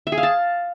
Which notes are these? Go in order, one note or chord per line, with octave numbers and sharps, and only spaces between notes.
E5
G#4
F5
A5